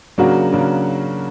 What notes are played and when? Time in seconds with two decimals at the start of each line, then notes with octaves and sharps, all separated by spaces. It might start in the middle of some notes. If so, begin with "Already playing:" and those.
0.18 C#3 F#3 A#3 D4 F#4
0.53 C#3 F#3 A#3 D4